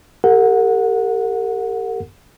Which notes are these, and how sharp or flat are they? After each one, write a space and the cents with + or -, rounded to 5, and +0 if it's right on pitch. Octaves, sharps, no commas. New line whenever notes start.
G4 +20 A#4 -40 F#5 -20